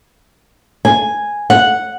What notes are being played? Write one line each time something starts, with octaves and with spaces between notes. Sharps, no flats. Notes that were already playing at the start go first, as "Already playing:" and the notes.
G#5
F#5